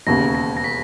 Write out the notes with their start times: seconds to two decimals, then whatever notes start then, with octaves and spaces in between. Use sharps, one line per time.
0.07 E1 D#2 C#3 A#6
0.35 A#6
0.57 A#6
0.64 B6